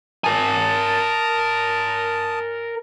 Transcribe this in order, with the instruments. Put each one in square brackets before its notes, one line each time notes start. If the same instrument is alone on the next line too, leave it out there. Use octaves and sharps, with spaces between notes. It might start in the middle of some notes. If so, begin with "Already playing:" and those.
[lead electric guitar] A#4 G#5 [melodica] A5 D#6